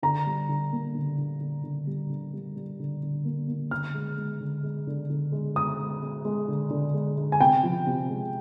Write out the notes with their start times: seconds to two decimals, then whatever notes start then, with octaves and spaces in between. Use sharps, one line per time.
0.02 D3 A#5
0.26 G3
0.49 D3
0.72 A#3
0.95 D3
1.18 D3
1.41 D3
1.64 D3
1.87 G3
2.10 D3
2.33 G3
2.56 G3
2.80 D3
3.03 D3
3.25 A#3
3.48 A#3
3.71 D3 F6
3.94 G#3
4.17 G#3
4.40 D3
4.63 G#3
4.87 D3
5.10 D3
5.32 G#3
5.55 G#3 D#6
5.79 G#3
6.02 G#3
6.25 G#3
6.48 D3
6.70 D3
6.94 G#3
7.17 G#3
7.32 G#5
7.40 C3 G5
7.63 F3
7.87 C3
8.09 G#3